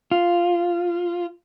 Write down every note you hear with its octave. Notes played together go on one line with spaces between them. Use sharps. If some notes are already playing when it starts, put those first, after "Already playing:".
F4